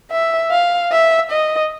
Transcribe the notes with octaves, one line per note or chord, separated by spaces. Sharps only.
E5
F5
E5
D#5